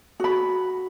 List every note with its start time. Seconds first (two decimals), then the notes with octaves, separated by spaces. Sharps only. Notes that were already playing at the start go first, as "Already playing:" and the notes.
0.20 F#4 B5